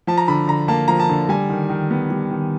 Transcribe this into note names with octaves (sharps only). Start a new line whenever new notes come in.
F3 A5
A#5
D3 B5
D3 A#5
A#3 A5
F3 A#5
A5
D3
G3 G#5
D#3
D#3
B3
G3
D#3